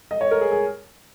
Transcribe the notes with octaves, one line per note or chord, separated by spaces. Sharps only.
D#5
C#5
A#4
G#4
G#4